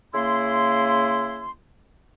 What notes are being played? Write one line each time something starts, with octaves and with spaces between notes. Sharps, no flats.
C#3 A#3 E4 C6